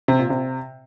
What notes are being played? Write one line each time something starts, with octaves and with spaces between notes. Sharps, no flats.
C3
A#2
C3